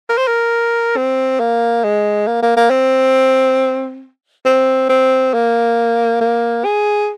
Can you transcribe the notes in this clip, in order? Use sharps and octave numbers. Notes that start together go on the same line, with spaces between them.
A#4
C5
A#4
C4
A#3
G#3
A#3
A#3
A#3
C4
C4
C4
A#3
A#3
G#4